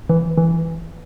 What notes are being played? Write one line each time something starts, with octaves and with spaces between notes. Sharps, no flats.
E3
E3